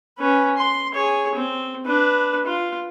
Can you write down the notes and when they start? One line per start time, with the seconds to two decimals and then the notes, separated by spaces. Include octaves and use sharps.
0.18 C#4 B4
0.57 C6
0.94 G#4 C#5
1.35 C4
1.86 D4 B4
2.46 F4